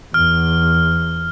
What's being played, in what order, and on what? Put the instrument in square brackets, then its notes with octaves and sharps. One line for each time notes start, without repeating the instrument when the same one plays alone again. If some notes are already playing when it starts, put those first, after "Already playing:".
[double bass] E2 [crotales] F6